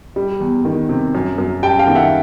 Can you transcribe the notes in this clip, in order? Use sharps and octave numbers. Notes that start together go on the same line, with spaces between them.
G3
E2
D#3
C3
F#2
F#2
G3 G5 A5
F5 G5
D#3
E5 F#5